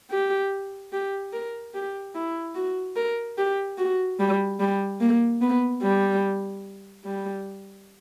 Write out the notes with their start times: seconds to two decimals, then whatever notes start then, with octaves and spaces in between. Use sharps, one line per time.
0.11 G4
0.93 G4
1.33 A#4
1.74 G4
2.15 E4
2.55 F#4
2.96 A#4
3.37 G4
3.78 F#4
4.19 G3
4.60 G3
5.01 A#3
5.41 B3
5.82 G3
7.05 G3